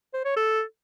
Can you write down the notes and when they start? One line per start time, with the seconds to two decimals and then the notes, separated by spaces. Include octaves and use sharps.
0.14 C5
0.25 C#5
0.37 A4